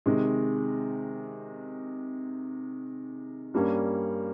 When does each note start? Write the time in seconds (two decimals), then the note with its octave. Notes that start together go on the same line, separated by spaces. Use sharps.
0.06 C3 D#3 G#3
3.54 G2 G3 A#3 C#4